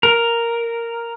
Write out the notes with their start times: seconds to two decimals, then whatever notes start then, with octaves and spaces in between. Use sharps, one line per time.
0.03 A#4